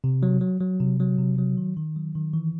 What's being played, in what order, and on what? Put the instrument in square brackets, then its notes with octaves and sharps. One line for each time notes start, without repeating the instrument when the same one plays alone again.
[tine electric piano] C3
F#3
F#3
F#3
C3
F#3
C3
F#3
D#3
D#3
F#3
D#3
E3